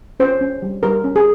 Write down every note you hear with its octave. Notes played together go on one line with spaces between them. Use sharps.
C#4 C5
C#4
G3
G3 A#4
C#4
G#4